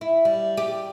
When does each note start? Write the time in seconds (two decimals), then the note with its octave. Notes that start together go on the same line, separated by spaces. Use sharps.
0.01 E4
0.25 G3
0.57 G4